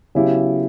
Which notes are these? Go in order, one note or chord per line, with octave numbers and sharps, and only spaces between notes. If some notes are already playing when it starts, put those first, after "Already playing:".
C#3 F#3 B3 E4 G4